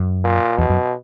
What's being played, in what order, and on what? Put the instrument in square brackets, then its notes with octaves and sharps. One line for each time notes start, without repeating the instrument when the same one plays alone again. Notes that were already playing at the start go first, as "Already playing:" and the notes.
Already playing: [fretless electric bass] F#2
[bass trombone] A#2
[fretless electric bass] E2 [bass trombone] B2
[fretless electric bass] F#2